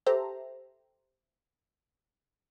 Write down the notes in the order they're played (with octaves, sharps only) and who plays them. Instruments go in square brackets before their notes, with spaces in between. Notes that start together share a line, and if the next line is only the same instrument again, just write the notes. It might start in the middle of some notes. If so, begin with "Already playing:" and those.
[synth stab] G4 A4 C5 E5 A#5